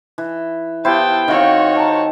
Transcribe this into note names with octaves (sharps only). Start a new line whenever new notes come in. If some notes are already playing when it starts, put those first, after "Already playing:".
E3
B3 E4 G4 C5 G5 A5
D#3 C4 F#4 C#5 F5
A5 A#5 D6